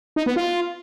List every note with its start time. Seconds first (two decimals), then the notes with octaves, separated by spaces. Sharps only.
0.16 D#4
0.26 B3
0.36 F4